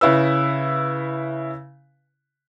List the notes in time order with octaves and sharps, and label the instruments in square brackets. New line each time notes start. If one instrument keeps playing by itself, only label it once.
[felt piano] C#3 E4 B4 E6